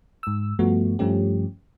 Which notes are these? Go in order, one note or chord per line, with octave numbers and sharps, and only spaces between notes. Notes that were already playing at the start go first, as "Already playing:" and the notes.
G#2 E6
G2 F3 A3 B3 F#4
G2 F3 A3 C#4 G4